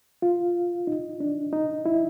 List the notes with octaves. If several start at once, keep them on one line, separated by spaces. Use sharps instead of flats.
F4
D#4
D4
D#4
E4